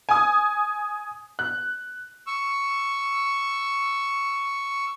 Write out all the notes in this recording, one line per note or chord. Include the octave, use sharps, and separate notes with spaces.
G#5 D#6
F#6
C#6 E6